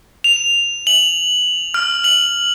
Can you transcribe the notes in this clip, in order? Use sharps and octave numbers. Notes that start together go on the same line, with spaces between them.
F7
F#7
F6
F#7